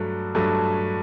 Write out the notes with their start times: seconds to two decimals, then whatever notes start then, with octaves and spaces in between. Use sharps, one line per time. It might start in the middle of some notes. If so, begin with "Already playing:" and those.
Already playing: G2 F#3 A3
0.35 G2 F#3 A3